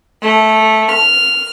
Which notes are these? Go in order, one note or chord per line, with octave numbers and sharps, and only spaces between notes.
A3
F6